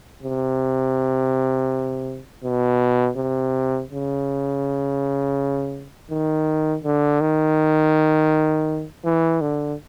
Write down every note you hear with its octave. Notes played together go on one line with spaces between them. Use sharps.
C3
B2
C3
C#3
D#3
D3
D#3
E3
D3